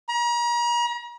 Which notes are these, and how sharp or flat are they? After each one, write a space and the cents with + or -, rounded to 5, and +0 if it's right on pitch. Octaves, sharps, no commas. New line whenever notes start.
A#5 +40